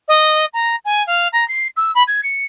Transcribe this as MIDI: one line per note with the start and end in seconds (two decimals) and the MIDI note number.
0.08 0.45 75
0.53 0.76 82
0.85 1.05 80
1.07 1.28 77
1.32 1.46 82
1.48 1.67 96
1.76 1.91 88
1.95 2.03 83
2.07 2.21 92
2.23 2.44 97